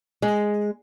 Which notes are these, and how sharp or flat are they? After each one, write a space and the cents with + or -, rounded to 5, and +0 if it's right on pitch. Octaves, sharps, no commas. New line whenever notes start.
G#3 +0